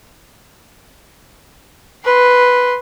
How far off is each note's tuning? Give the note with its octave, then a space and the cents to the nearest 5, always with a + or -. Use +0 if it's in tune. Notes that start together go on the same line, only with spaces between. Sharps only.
B4 +0 C6 +0